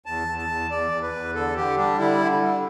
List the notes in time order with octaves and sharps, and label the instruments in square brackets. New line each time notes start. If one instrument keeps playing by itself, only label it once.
[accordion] E2 A5
E2
A5
E2
E2 D5
E2
B4
E2
D3 A4
D3 G4
G3 D4
D3 E4
D3
G3